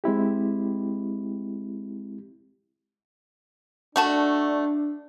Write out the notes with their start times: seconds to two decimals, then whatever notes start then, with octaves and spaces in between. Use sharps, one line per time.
0.04 G#3 C4 E4 G4
3.96 A3 D4 F#4 A5